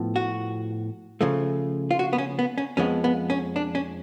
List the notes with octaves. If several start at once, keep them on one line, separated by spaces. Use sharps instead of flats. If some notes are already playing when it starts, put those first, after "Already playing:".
Already playing: A2 F3 B3
F#4
C#3 F3 A3
F4
F#4
B3
C#4
B3
C#4
F2 F3 G#3 B3 C#4
B3
C#4
D4
C#4